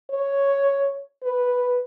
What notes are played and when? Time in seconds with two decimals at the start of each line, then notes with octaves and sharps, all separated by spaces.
0.10 C#5
1.23 B4